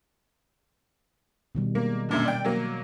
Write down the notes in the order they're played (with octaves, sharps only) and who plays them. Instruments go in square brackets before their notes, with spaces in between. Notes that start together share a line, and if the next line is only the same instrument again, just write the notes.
[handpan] B2 D#3 G3
[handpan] G#3 [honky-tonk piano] A#3
[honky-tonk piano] F#2 A#2 D3
D5 G5
F#3 A#3